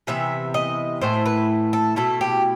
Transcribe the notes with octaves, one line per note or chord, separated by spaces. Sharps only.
C3 E3 B3 E5
D#5
A2 E3 A3 E4 C5
B4
A4
B2 A3 E4 A4
G4